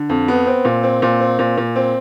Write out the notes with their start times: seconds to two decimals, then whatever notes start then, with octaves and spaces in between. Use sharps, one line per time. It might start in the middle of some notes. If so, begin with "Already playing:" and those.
Already playing: D3
0.09 F2
0.28 B3
0.47 C4
0.65 A#2
0.83 C4
1.02 A#2
1.20 C4
1.39 A#2
1.57 A#2
1.76 C4